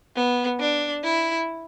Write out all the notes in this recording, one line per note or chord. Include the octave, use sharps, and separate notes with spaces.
B3
D4
E4